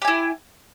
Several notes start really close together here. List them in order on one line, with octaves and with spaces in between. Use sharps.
G4 G#5 E4